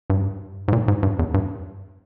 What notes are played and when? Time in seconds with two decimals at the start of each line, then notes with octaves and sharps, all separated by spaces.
0.10 G2
0.68 G#2
0.73 A#2
0.88 G#2
1.03 G2
1.19 E2
1.34 G2